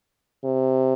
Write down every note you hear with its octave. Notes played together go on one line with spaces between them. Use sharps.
C3